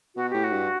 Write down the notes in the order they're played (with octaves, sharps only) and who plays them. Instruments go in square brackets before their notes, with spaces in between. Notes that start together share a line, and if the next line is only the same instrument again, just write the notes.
[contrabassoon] B2 [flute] F#4
[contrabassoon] A2 [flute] G4
[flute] F#4
[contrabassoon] G2